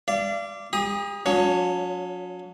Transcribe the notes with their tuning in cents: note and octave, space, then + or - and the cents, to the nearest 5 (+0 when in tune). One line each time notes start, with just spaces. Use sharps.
D5 -5 F5 -40
G4 +45 A#5 +45 D#6 +0
F#3 -45 C#4 +35 C#5 +5